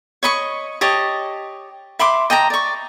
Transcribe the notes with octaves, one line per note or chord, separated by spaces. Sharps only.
C#5 D#5 B5 C#6
G4 C#5 D#5 A5
E5 B5 C6 D6
D#5 G5 A5 A#5
D5 C#6